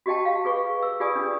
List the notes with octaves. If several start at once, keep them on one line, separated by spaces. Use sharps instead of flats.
F#4 G4 D#5 G5 A5
F5
G#4 B4 C#6
E6
F4 G4 G#4 D5 G#5 D#6
D4